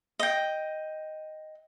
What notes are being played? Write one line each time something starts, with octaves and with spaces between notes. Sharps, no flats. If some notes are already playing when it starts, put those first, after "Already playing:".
D#5 G5